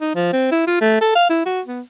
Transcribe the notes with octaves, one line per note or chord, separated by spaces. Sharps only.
D#4
F3
C4
E4
F4
A3
A4
F5
E4
F#4
B3